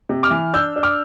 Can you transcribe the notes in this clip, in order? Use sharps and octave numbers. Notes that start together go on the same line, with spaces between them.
C3
D6 F6
E3
D4 E6 G6
D4
D6 F6